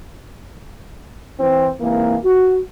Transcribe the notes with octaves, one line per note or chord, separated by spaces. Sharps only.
E3 C4
G#2 C3 E3 A#3
F#4